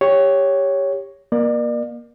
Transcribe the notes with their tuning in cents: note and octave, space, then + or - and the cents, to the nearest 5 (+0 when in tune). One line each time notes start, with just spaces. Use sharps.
G4 +15 C#5 +0
A#3 +20 D5 +40